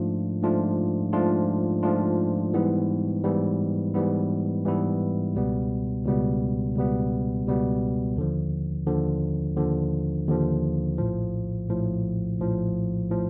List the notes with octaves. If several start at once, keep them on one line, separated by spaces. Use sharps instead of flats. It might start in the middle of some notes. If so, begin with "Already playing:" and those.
Already playing: G#2 F3 A3 D4 F4
G#2 F3 A3 D4 F4
G#2 F3 A3 D4 F4
G#2 F3 A3 D4 F4
G#2 E3 G3 B3 E4
G#2 E3 G3 B3 E4
G#2 E3 G3 B3 E4
G#2 E3 G3 B3 E4
C#2 B2 G3 B3
C#2 B2 G3 B3
C#2 B2 G3 B3
C#2 B2 G3 B3
D#2 D3 F3
D#2 D3 F3
D#2 D3 F3
D#2 D3 F3
A#1 A2 F3
A#1 A2 F3
A#1 A2 F3
A2 F3